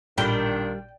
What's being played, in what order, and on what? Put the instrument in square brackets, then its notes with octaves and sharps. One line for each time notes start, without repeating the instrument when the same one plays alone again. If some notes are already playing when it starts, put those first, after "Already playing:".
[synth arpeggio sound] A1 A#2 B5 [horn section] D#3 D4 F4 [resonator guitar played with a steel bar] G3 [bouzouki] G5